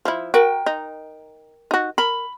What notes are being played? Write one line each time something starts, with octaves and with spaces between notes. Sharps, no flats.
F3 E4
F#4 A#4 G5
D#4
D#4 F#4
A#4 B5